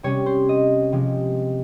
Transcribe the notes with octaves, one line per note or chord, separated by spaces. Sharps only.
C3 G3 C#4 C#5
C5
D#5
C3 F3 G#3